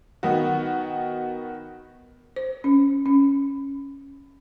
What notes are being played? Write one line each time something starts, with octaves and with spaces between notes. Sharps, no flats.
D#3 B3 F#4
C5
C#4
C#4